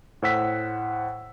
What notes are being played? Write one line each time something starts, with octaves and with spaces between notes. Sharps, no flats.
A2 C5 F#5 E6 B6